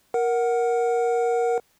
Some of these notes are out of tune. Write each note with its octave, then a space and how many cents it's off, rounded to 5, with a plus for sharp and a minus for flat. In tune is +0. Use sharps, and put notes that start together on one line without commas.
A#4 +10 F#5 +0